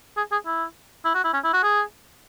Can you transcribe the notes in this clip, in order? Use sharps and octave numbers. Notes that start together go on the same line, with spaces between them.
G#4
G#4
E4
E4
F#4
E4
C#4
E4
F#4
G#4